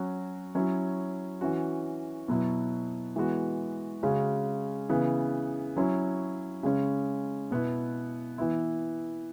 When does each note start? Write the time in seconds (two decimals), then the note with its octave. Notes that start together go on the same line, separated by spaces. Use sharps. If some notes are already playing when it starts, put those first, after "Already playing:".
Already playing: F#3 C#4 F#4
0.55 F#3 C#4 E4
1.41 E3 C#4 F#4
2.28 B2 F#3 B3 E4
3.16 E3 G#3 B3 F#4
4.03 C#3 G#3 C#4 F#4
4.90 C#3 E3 B3
5.76 F#3 C#4 E4
6.63 C#3 G#3 C#4
7.51 B2 B3 E4
8.38 E3 B3 E4